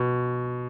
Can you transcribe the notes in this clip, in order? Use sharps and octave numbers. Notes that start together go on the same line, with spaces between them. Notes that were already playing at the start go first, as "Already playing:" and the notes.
Already playing: B2